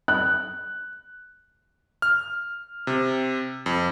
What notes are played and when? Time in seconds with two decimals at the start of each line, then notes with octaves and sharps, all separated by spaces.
0.08 F#6
2.02 F6
2.87 C3
3.66 F2